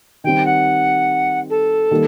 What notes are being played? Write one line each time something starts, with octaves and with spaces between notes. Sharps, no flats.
D#3 G3 C4 G5
F#5
A4
D#3 G3 A#3